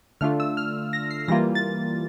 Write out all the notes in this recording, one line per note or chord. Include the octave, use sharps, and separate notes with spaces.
D3 A3 D4 F4 F6
E6
F6
A#6
C7
E3 G3 A#3 F4 A#6
A6